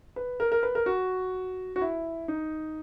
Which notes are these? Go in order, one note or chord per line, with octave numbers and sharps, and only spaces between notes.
B4
A#4
A#4
B4
A#4
F#4
F#4
E4
D#4